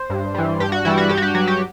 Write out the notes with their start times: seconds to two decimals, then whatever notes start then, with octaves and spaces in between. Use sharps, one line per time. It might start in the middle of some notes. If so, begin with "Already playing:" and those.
Already playing: C5
0.10 G2
0.35 E3 G3
0.60 G2 G4
0.72 F#4
0.85 E3 G3 E4
0.98 F#4
1.09 G2 G4
1.17 F#4
1.22 G4
1.35 F#3 F#4
1.48 G4